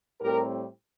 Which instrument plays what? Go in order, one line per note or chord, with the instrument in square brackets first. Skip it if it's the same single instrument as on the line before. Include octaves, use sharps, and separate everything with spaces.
[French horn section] A2 G3 C4 G4 A#4